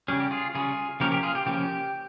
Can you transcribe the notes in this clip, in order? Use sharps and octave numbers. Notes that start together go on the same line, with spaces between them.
C#3 G3 C#4 G#4
G4
F4 G#4
C#3 G3 C#4 F4 G#4
C#3 F3 A#3 C#4 G4 A#4
G4 A#4
F4 G#4
G4
C#3 F3 A#3 C#4 G4